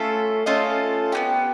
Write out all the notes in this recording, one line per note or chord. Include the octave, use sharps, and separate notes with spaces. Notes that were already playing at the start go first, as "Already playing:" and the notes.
Already playing: A3 C#4 F4 A4 E5
A3 C#4 F4 A4 D#5
B3 D#4 G4